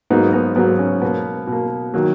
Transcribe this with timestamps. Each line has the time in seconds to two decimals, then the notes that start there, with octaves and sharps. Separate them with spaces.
0.10 G#2 F#3 A#3 B3 D#4
0.33 B3 D#4
0.56 G#2 F#3 A#3 B3
0.79 C#4
1.02 B2 A#3 B3
1.47 B2
1.52 A#3
1.94 D#3 F#3 A#3